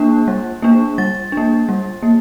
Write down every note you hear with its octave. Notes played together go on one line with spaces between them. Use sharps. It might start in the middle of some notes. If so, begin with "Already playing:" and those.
Already playing: A#3 D4 F#6
G3
A#3 D4
G3 A6
A#3 D4
G3
A#3